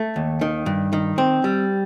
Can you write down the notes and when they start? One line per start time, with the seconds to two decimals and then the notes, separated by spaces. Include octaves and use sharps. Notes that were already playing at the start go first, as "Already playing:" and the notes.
Already playing: A3
0.16 D#2
0.41 D#3
0.66 G2
0.93 D#3
1.18 C4
1.44 G3